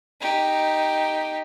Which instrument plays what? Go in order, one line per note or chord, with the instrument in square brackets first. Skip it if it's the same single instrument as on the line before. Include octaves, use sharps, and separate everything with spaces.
[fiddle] D#4 G4